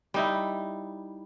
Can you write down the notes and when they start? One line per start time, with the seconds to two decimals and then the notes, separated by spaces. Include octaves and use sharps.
0.14 G3 D#4 E4